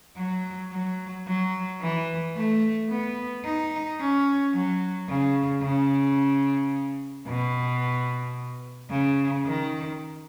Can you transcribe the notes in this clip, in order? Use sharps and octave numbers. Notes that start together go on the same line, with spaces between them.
F#3
F#3
F#3
E3
A3
B3
D#4
C#4
F#3
C#3
C#3
B2
C#3
D#3